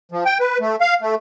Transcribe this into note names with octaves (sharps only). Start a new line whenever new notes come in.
F3
G5
B4
A3
F5
A3